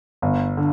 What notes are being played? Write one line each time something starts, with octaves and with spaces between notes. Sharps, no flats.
G1
D3